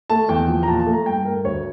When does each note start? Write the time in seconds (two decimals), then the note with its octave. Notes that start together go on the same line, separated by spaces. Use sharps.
0.10 A3 A5
0.29 E2 G5
0.48 F3
0.63 A#5
0.67 A#2 A5
0.80 A5
0.86 A3
0.93 A#5
1.06 G2 G5
1.25 A3 A#4
1.45 D2 C#5